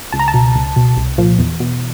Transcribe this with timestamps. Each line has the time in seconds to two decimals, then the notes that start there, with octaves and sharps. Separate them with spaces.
0.12 C#2 A5
0.19 A#5
0.28 A5
0.34 B2
0.55 C#2
0.76 B2
0.97 C2
1.18 A#2 F3
1.39 E2
1.60 B2